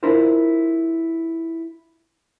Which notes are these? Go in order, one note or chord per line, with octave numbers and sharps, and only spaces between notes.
D4 E4 F4 A#4 C5